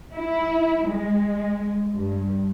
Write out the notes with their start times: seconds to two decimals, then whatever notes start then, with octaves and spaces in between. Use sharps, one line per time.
0.17 E4
0.88 G#3
1.96 G2